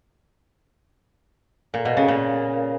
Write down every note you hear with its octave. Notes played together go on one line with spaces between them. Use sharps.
A#2
B2
C#3
A#2